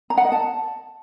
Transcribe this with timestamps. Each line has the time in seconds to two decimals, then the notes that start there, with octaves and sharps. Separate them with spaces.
0.10 A#5
0.17 F#5
0.25 D#5
0.32 A5